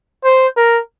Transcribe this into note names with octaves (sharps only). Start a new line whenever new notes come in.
C5
A#4